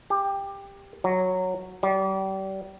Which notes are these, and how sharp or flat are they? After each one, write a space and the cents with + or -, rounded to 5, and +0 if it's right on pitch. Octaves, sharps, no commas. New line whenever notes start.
G4 +15
F#3 -5
G3 -35